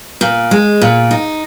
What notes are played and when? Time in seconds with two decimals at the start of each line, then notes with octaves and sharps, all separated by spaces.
0.21 A#2
0.51 G#3
0.81 A#2
1.11 D#4